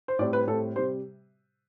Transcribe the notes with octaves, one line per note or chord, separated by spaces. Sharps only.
C5
A2 G3 C4 D5
B4
A2 G3 C4 A4
C3 G3 C5